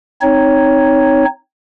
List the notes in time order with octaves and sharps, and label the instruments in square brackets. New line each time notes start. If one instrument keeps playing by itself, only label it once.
[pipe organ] C4 D#4 C#5